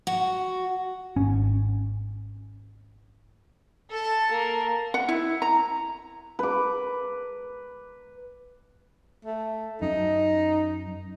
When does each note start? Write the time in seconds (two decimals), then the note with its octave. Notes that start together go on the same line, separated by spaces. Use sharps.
0.07 F#4
1.16 G#1 C#4
3.90 A4 A5
4.31 A#3
4.94 F#5
5.09 E4
5.42 A#5
6.39 B4 D6
9.25 A3
9.82 F#2 D#4